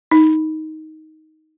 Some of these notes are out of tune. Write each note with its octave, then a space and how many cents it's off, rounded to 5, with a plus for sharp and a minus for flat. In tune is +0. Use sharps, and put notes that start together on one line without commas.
D#4 +10